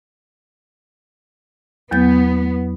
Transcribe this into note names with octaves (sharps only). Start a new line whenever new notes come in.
E2 F#3 B3 G6